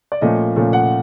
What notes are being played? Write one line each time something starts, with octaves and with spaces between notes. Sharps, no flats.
D5
A#2 F3 A3 C#4 D#5
A#2 F3 A3 C#4
F#5